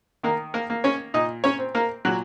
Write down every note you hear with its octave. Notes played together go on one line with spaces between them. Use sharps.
D#3 A#3 A#4
A#3 A#4
A#3
C#4 C#5
A#2 D#4 D#5
C#4 C#5
C4
A#3 A#4
A#2 F#3 F#4